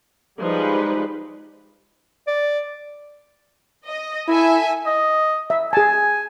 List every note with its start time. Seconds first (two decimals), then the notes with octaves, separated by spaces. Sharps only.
0.40 F3 G3 G#3 D#4 B4
2.27 D5
3.87 D#5
4.28 E4 A4 E5 G#5
4.86 D#5
5.50 E5
5.73 G#4 G#5 A5